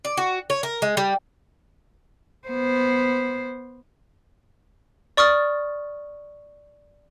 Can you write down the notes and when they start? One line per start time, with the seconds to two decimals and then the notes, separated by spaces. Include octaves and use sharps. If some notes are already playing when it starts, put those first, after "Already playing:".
0.05 D5
0.17 F#4
0.50 C#5
0.63 A#4
0.82 G#3
0.97 G3
2.48 B3 C5
5.17 D5 C#6 D#6 F6 A6